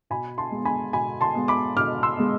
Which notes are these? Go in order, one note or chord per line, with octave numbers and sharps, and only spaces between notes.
B2 G#5 B5
A5 C6
G#3 B3
G#5 B5
B2 G#5 B5
A5 C6
G#3 B3
B5 D6
B2 D6 F6
C6 E6
G#3 B3